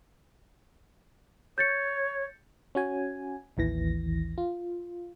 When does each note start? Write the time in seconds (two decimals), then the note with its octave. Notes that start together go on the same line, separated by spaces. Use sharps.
1.58 C#5 G6 A6 C#7
2.75 C#4 F#4 G#5
3.57 A1 D#2 E3 A#6
4.38 F4